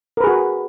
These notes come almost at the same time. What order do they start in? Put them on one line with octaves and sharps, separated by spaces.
A#4 B4 G#4 F#4